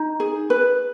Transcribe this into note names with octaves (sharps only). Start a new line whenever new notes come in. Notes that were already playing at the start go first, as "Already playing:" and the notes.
Already playing: D#4
G#4
B4